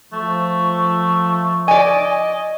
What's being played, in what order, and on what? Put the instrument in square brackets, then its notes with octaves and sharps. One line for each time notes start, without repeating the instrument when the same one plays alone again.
[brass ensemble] F3 [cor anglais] A3 [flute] C#6
[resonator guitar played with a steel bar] D5 G#5 [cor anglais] D#5